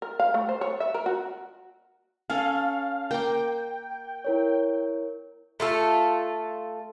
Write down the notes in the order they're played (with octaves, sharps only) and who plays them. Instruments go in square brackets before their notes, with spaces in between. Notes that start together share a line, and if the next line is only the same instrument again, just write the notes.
[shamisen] A#4
F5
A3
C5
C#5
E5
A#4
F#4
[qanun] C#4 A4 [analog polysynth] F5
[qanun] A#3 D6 [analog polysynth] G5
[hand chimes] E4 A#4 C#5
[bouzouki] A3 F4 A4